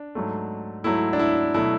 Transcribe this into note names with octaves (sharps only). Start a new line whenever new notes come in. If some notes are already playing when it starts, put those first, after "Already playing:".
Already playing: D4
G#2 F#3 A3
G#2 F#3 A3 E4
D4
E4
B2 F#3 A3 E4